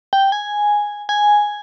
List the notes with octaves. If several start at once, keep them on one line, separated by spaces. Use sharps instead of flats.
G5
G#5
G#5